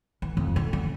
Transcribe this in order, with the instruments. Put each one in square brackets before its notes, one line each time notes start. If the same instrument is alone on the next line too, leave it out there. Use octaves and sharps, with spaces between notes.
[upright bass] E3
F2
D3
C#4